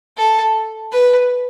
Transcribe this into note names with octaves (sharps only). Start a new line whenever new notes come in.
A4
B4